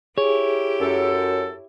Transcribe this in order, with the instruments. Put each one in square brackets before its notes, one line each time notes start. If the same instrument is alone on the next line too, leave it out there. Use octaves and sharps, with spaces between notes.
[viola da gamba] E4 G4 [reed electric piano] G#4 [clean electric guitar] C#5
[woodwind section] F#2 A4